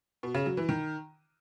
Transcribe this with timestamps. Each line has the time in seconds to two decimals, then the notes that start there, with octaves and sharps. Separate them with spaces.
0.23 B2
0.34 C#3
0.46 F#3
0.57 E3
0.69 D#3